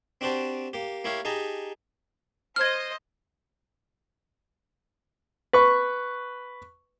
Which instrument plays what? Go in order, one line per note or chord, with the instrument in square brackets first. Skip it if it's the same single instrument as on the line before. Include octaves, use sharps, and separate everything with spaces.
[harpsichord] C4 D4 F#4 G4 C5 A5
A#3 G4
A#3 E4 G4 C#5 F5
D#4 G4 G#4 A5 A#5
[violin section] C5 D#5 [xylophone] F6 G#6
[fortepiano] B4 C#6